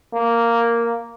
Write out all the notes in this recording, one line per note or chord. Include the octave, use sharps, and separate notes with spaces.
A#3